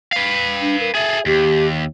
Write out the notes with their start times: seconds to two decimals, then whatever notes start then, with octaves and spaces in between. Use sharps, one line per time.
0.12 B4 F5
0.61 D4
0.80 A#4
0.95 G#4 A4 E5
1.26 D#2 G4